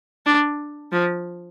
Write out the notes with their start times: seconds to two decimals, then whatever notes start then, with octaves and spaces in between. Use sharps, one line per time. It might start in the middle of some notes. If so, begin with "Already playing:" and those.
0.26 D4
0.92 F3